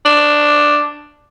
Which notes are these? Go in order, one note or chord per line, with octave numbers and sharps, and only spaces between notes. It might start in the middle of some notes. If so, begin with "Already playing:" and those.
D4